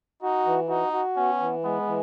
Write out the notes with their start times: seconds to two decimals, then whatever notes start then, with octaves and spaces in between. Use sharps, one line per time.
0.22 D#4 F#4
0.46 E3
0.69 D#4 F#4
0.93 F#4
1.16 B3 C#4
1.40 E3
1.64 G#3 B3
1.87 E3